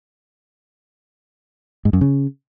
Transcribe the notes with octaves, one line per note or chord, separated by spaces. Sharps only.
G#2
F#2
C#3